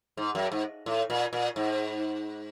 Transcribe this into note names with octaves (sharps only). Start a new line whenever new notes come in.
G#2
F#2
G#2
A2
A#2
A#2
G#2